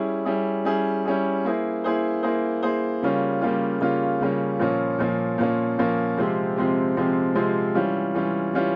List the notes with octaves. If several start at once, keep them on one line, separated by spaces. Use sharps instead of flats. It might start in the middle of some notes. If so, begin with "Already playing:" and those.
Already playing: G3 C#4 E4 G#4
G3 C#4 E4 G#4
G3 C#4 E4 G#4
G3 C#4 E4 G#4
A#3 E4 G#4 C5
A#3 E4 G#4 C5
A#3 E4 G#4 C5
A#3 E4 G#4 C5
C#3 G3 A#3 C#4 F4
C#3 G3 A#3 C#4 F4
C#3 G3 A#3 C#4 F4
C#3 G3 A#3 C#4 F4
A#2 F3 A#3 C#4
A#2 F3 A#3 C#4
A#2 F3 A#3 C#4
A#2 F3 A#3 C#4
C3 F3 G#3 C4 G4
C3 F3 G#3 C4 G4
C3 F3 G#3 C4 G4
C3 F3 G#3 C4 G4
E3 G3 C#4 F4
E3 G3 C#4 F4
E3 G3 C#4 F4